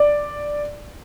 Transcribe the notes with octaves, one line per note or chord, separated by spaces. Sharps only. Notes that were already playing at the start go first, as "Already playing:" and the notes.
Already playing: D5